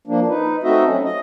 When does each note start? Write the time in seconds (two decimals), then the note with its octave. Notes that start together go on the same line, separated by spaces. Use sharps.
0.07 F3 A#3 D4
0.28 D#4 B4
0.63 A3 C4 D#4 F#4 D#5 E5
0.86 F#3 C#4
1.03 D#5